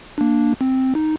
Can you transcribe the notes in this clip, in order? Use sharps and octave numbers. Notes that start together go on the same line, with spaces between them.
A#3 D4
C4
D#4